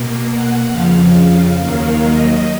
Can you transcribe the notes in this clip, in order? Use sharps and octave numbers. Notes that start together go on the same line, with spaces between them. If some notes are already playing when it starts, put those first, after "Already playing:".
Already playing: B2 A#3
F#5
F2 C#3 F3 F5
D#2 D#3 F#3 A#3 F5
D#5